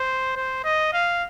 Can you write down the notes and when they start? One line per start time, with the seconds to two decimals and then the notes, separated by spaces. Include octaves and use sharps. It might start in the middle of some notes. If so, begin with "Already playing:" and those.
Already playing: C5
0.36 C5
0.64 D#5
0.93 F5